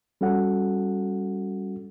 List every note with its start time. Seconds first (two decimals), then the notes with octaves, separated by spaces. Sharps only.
0.21 G3 C#4 F#4 A4 F#5